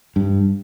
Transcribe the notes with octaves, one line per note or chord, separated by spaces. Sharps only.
G2